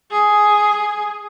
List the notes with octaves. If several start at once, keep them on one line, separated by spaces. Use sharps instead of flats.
G#4